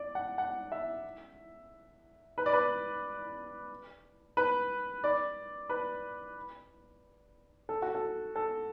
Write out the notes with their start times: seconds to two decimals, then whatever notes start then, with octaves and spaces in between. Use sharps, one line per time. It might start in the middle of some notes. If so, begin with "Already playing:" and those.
Already playing: D5
0.15 F#5
0.38 F#5
0.72 E5
2.38 B4
2.46 D5
2.53 B4
4.37 B4
5.04 D5
5.69 B4
7.69 A4
7.82 F#4
7.95 A4
8.36 A4